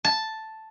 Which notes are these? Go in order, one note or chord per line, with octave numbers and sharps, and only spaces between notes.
A5